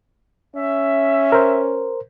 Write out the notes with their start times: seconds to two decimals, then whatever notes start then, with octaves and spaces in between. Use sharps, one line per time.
0.55 C#4 E5
1.32 A#4 C5